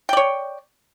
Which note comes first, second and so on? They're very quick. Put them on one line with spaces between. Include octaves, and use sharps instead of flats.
G5 D5 C#5